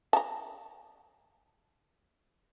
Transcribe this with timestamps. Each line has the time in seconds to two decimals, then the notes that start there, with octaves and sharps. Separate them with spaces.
0.13 A5 A#5